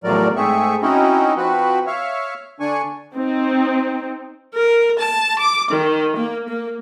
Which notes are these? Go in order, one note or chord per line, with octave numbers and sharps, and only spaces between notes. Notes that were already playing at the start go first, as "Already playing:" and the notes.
E2 A2 F3 F#3 A#4 D5
G#2 A3 C4 G#4 E5 C#6
C4 C#4 D#4 E4 F#4 D#5
F3 C4 F#4 B4
C#5 E5 F5
D3 D4 G#5 C#6
C4 D#4
A#4
A5
D6
D#3
A#3
A#3